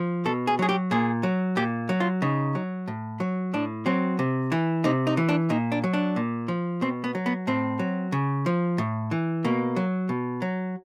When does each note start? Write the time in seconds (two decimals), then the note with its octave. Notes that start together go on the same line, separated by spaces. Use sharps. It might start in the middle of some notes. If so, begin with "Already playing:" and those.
Already playing: F3
0.25 B2 A4
0.47 G#4
0.59 F#3 G#4
0.69 G4
0.91 A#2 G#4
1.23 F#3
1.57 A#2 G4
1.89 F#3
2.00 F4
2.22 C#3 D#4
2.55 F#3
2.88 A2
3.20 F#3
3.54 A2 D4
3.86 F#3 C4
4.19 C3
4.52 E3
4.84 C3 D#4
5.07 D#4
5.17 E3
5.29 D4
5.50 A#2 D#4
5.72 D4
5.84 F#3
5.93 D4
6.16 A#2
6.48 F3
6.81 B2 C4
7.04 B3
7.15 F#3
7.26 B3
7.47 A2 C4
7.79 F#3
8.12 C#3
8.46 F3
8.78 A2
9.11 E3
9.44 B2 A#3
9.76 F#3
10.09 B2
10.42 F#3